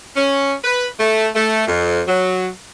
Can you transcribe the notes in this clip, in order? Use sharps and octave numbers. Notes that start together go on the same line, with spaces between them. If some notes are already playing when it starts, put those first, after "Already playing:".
C#4
B4
A3
A3
F2
F#3